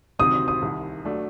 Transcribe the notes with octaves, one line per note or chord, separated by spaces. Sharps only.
D2 C3 D#3 F#3 C4 D#6
D#6
C2 C3 D#3
F#3 A3 D4